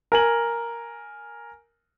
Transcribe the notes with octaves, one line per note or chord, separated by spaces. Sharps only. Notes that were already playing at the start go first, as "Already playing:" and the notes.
A#4 G#5 F#7